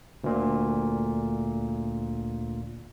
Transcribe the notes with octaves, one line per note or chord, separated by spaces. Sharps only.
D2 A#2